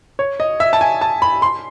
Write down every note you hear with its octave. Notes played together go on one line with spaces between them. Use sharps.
C#5
D#5
E5
A5
G#5
A5
B5
C6